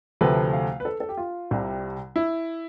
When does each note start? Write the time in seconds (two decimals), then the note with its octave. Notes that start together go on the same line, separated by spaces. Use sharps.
0.21 D2 C3 F3 A3 B4
0.53 F5
0.80 B4
0.85 A4
1.00 A4
1.09 G4
1.17 F4
1.51 C2 C3 G3
2.16 E4